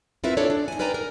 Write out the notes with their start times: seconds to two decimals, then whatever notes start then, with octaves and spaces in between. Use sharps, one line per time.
0.24 C4 E4 F4 A#4 B4 E5
0.37 D4 E4 G#4 A4 C#5 D5
0.50 D4
0.68 D#4 G#5
0.79 A#4 B4 D5 G5 G#5 A#5
0.94 A#4